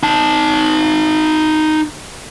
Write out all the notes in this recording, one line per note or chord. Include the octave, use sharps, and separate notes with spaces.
D#4 A5